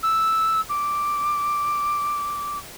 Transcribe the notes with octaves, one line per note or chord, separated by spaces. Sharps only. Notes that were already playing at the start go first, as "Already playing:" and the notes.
E6
D6